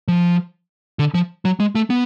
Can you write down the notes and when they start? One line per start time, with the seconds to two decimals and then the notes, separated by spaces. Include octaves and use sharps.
0.08 F3
0.99 D3
1.14 F3
1.45 F#3
1.60 G#3
1.75 A3
1.90 B3